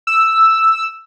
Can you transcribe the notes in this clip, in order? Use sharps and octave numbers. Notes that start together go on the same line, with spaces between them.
E6